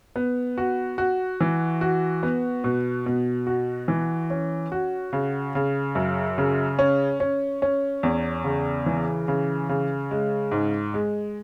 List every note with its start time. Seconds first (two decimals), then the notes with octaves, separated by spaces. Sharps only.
0.16 B3
0.58 F#4
0.98 F#4
1.41 E3
1.81 F#4
2.23 B3
2.64 B2
3.06 B2
3.47 F#4
3.88 E3
4.30 C#4
4.72 F#4
5.13 C#3
5.55 C#3
5.95 F#2
6.38 C#3
6.79 C#4
7.20 C#4
7.62 C#4
8.03 E2
8.44 C#3
8.86 E3
9.28 C#3
9.69 C#3
10.11 G#3
10.51 G#2
10.94 G#3